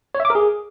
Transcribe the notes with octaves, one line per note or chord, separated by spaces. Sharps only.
C#5
E5
D6
A#4
G#4